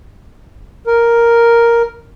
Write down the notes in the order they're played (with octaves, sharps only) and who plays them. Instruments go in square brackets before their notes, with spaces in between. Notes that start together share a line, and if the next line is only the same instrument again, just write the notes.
[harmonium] A#4